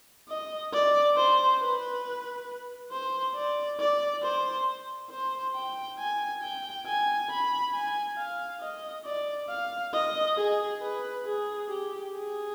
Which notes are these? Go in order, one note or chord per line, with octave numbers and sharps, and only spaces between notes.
D#5
D5
C5
B4
C5
D5
D5
C5
C5
G5
G#5
G5
G#5
B5
G#5
F5
D#5
D5
F5
D#5
G#4
B4
G#4
G4
G#4